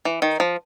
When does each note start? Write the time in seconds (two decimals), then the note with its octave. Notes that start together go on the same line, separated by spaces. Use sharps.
0.05 E3
0.22 D#3
0.40 F3